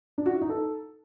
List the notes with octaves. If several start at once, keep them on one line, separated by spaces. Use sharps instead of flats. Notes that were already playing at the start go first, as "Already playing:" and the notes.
D4
F#4
E4
D#4
A4